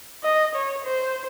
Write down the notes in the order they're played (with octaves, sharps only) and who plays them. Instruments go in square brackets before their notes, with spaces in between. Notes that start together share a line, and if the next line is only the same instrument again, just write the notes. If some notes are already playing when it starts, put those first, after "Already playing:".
[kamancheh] D#5
C#5
C5